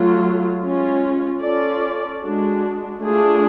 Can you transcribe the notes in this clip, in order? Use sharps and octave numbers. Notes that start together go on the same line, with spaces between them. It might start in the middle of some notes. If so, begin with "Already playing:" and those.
Already playing: F#3 A3 F4
G#3 C#4 F4
C#4 F4 A4 D5
G#3 D4 F#4
A3 D4 F4 G#4